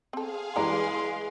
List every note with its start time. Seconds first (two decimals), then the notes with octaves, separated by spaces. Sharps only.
0.13 C4 G#4 A4 F5
0.56 E3 G3 G#3 D5 A#5 C6